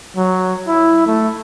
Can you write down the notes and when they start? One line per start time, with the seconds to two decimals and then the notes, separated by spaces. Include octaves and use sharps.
0.17 F#3
0.67 E4
1.06 A3